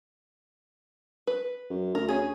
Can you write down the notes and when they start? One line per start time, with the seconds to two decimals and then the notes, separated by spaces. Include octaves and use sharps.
1.27 B4
1.70 F#2
1.95 D2 A#4
2.09 C#4 G#4